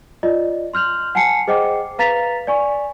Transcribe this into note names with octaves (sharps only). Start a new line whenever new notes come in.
F4 D5 D#5
C6 F6 G6 F7 F#7
F#5 G#5 A5 C7 C#7
G#4 C5 D#5 F#5 G5 D6
B4 F5 A#5 A6 B6 F7
D5 G#5 C#6